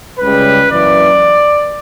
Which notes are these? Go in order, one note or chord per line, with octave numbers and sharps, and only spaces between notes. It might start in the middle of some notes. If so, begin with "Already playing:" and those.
C#2 C#3 G3 B4
F#2 E3 A#3 D5